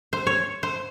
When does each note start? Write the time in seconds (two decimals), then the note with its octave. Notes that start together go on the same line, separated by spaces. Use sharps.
0.13 C5
0.27 C#5
0.63 C5